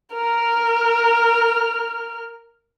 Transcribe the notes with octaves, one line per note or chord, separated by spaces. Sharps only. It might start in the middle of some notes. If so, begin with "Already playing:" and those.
A#4 F6